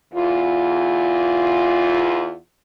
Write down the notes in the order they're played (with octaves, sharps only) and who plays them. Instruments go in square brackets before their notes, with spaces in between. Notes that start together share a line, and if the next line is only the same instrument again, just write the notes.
[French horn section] E2 F4